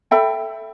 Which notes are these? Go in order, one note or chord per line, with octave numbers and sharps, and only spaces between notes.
A4 E5 G5 B5